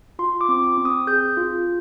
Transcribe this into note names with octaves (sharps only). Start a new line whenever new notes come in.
F4 C6
D6
C4
D6
C4
D#6
G#4 G6
F4